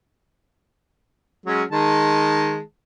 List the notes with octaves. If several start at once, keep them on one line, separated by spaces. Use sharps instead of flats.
F#3 G#3 C#4
D#3 G#3 A5